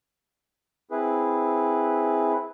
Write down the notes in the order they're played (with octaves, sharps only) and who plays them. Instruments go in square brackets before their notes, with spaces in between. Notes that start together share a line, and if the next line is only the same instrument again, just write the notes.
[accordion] C4 E4 G#4 B4